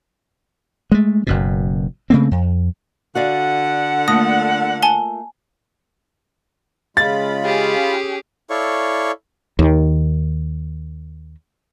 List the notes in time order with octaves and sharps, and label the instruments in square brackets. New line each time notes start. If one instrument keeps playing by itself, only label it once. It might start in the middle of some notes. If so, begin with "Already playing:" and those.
[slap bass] G#3 A3
F#1 F#2 B2
C#3 A3 A#3 C4
F2
[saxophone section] D3 F#5 [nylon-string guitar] F#4 D5 F5
[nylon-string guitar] A3 A#3 F4 [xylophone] D#6 A#6
[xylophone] G#5 A5 G7
[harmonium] C#3 G#3 [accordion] F4 B5 [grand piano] A6
[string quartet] C#4 G4 G#4
[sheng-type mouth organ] E4 A4 C#5 D5 F5 C#6
[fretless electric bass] D#2 D#3